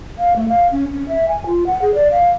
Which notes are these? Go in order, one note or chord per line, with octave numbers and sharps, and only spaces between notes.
F5
A3
F5
C#4
C#4
E5
G#5
F4
F#5
G#4
D5
F5